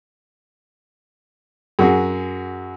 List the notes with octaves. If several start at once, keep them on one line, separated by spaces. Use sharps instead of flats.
F#2 F#4 G#4